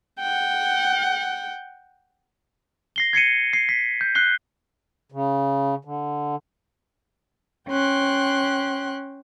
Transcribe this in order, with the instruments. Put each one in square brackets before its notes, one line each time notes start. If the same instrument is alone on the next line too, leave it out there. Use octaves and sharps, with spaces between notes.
[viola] F#5 G5
[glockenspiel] A#6 C7 G7
G#6 C7 C#7 D#7
C7
B6
G6
F#6 C7 G7
[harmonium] C#3
D3
[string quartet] C#4 G5 C6 F#6